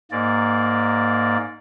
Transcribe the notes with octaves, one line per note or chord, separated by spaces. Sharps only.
G#2 A#3 D5